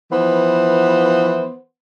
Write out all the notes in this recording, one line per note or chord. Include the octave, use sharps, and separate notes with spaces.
E3 F3 B3 C5